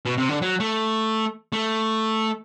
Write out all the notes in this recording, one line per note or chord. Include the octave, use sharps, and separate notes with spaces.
B2
C3
D3
F#3
A3
A3